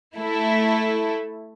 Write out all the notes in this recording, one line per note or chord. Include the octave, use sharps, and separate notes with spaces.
A3 E4 A4